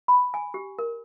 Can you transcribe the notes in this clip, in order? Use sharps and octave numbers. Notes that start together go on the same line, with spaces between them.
B5
G#5
G4
A#4